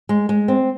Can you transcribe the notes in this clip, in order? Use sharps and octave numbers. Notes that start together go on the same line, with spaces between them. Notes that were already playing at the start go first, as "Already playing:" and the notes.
G#3
G#3
C4